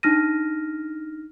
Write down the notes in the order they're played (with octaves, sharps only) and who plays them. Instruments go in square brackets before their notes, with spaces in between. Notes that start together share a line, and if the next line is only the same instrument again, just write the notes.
[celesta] D4 D#4 F6 A#6 D#7